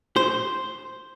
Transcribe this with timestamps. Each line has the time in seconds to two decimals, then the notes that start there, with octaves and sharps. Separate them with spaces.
0.16 C5